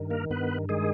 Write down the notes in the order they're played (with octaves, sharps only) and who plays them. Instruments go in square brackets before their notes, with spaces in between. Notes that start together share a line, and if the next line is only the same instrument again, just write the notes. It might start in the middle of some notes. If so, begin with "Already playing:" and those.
Already playing: [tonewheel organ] G2 D#3
A#3 A#4
G2 B3 B4
D#3 G#3 G#4